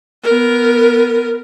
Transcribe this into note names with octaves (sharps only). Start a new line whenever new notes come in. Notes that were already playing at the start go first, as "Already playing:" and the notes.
B3 A#4